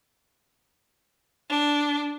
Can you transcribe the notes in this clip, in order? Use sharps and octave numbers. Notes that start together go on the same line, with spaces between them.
D4